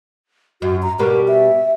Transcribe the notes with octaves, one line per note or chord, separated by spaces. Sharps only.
F#2 F#4
A#5
B2 G3 B3 A#4
E5